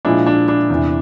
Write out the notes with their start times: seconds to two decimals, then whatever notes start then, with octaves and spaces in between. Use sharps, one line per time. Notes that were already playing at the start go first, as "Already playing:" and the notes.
0.05 A#2 F3 G#3 D4 E4
0.27 D4
0.48 D4
0.70 E2 C3 E3